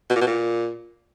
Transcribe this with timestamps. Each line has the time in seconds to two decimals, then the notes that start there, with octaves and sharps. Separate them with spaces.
0.10 B2
0.16 A#2
0.21 B2
0.27 A#2